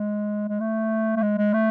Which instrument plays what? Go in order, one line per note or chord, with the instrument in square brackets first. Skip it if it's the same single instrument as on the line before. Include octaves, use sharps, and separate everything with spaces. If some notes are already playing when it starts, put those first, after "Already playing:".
Already playing: [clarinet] G#3
G#3
A3
A3
G#3
G#3
A3